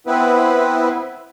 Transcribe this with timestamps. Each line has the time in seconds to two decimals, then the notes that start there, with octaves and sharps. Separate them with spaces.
0.07 B3 C4 E4 B4